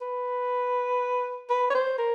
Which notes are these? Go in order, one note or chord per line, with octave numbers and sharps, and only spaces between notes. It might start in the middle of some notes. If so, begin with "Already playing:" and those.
B4
B4
C#5
C5
A#4